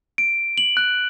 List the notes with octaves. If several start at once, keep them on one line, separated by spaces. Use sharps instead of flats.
D7
F#7
F#6